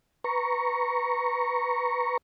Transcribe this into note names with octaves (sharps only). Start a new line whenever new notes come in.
B4 A#5 C#6